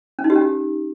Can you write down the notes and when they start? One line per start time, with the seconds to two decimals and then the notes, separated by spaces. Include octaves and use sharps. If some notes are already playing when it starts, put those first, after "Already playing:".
0.19 C#4
0.24 D#4
0.30 G4
0.36 C#4
0.41 G4